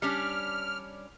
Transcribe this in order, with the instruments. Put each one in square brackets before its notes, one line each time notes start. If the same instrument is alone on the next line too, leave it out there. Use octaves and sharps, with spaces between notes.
[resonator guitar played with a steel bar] G3 C#4 D4 [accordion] F6